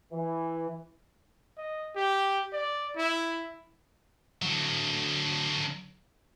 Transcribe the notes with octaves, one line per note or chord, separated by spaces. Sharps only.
E3
D#5
G4
D5
E4
D3 F#3